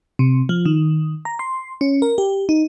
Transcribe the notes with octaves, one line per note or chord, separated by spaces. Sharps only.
C3
F3
D#3
A#5
C6
C#4
A#4
G4
D#4